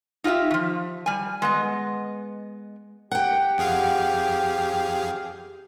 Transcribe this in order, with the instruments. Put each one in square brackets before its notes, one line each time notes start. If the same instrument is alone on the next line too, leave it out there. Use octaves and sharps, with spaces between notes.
[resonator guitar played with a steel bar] D#4 F4 G4 D#5 E5
D#3 F3
G3 G#5
G#3 B3 D#5
[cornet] G4 [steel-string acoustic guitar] F#5 G5
[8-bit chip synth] F2 G#4 F5